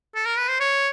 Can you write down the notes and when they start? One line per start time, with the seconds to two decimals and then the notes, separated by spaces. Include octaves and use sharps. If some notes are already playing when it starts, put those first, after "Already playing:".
0.15 A4
0.26 A#4
0.38 B4
0.48 C5
0.60 C#5